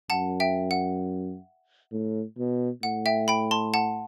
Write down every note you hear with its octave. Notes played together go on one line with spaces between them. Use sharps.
F#2 F#5 A5
E5 G5
F#5
A2
B2
A2 F#5
E5 G5
G5 B5
A5 C6
F#5 A5